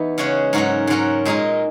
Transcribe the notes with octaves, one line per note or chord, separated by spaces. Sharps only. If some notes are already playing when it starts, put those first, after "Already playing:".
Already playing: E2 B3 D#4
C#3 G#3 C#4 F#4
G#2 F#3 C#4 F#4 A#4
G#2 F#3 C#4 F#4 A#4
A#2 G#3 D#4 A#4